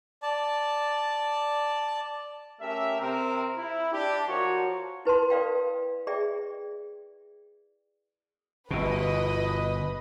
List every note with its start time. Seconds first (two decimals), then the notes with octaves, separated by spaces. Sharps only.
0.23 D5 A5
2.60 A3 C#4 G4 A#4 E5
3.00 C3 C4 A#4
3.56 E4
3.92 D4 G4
4.27 F3 F#4 A#4 C#5
5.05 E4 B4 A5 C6
5.30 A#4 B4 D5 F5 G5
6.07 G#4 D5 E5 G5
8.71 G1 B2 B4 D#5